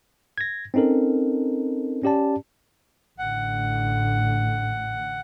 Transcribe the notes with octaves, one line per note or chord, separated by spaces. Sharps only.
G#6 A#6
C4 C#4 D#4 A4 A#4
C#4 G4 D5 A5
A1 A2 D3 F#5